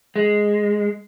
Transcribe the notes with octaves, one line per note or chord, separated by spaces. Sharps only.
G#3